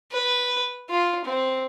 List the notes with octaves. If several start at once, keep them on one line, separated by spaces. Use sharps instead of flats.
B4
F4
C4